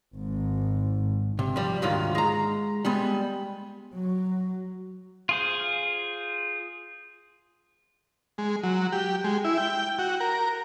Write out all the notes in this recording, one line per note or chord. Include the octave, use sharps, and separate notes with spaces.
G#1 G#2
C3
F3 G3
D2 G#2 D#3 F4
G#3 A#5
G3 G#3 B3
F#3
F4 G#4 C5
G#3
F#3
G4
G#3
E4
G5
F#4
A#4